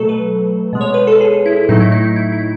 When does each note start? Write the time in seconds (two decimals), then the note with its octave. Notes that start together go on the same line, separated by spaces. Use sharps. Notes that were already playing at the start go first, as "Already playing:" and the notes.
Already playing: B2 F#3 A3 A4
0.09 B4
0.73 B2 G#3
0.81 C#5
0.94 B4
1.07 A4
1.21 G#4
1.46 E4
1.69 A2 F#3 A3 D#4
1.80 E4
1.92 D#4
2.16 E4
2.32 E4